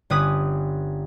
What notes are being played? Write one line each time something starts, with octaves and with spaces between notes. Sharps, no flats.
G1 C#4 B4 D#6 B6